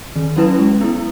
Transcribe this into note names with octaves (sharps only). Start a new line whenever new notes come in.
D#3
F#3 C#4 E4 B4
G#3
B3 E4